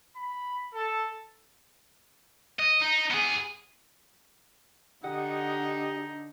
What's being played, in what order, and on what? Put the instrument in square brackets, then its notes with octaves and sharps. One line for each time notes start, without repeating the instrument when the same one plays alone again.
[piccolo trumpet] B5
A4
[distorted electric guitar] D#5
D#4
B3 G#4
[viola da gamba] D3 [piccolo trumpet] D#4 [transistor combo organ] G4 D#5 [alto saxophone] F#5